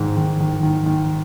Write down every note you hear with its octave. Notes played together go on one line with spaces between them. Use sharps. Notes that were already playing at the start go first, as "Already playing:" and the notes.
Already playing: G#2 D#3
D#3
D#3
D#3
D#3